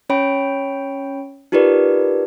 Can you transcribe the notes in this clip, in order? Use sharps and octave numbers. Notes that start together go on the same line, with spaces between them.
C#4 C#5 G5 B5 D7
D#4 F4 G4 A#4 B4 D5